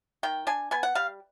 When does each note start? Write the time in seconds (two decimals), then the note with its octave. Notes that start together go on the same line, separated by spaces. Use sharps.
0.23 D#3 G5
0.47 D4 G#5
0.71 B3 G#5
0.83 F#5
0.95 G3 F5